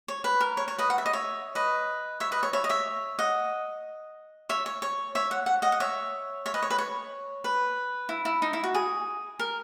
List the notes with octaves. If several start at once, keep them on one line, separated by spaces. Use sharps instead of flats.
C#5
B4
A#4
C#5
C#5
B4 D#5
F#5
E5
D#5
C#5 E5
B4 D#5
C#5 E5
B4 D#5
C#5
C#5 E5
D#5
C#5 E5
D#5 F#5
C#5 E5
C#5
C#5
C#5 E5
F#5
F#5
D#5 F#5
F#5
C#5 E5
C#5 E5
B4 D#5
C#5
B4
C#5
B4
E4
E4
D#4
E4
F#4
G#4
A#4